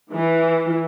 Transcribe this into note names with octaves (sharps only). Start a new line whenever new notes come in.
E3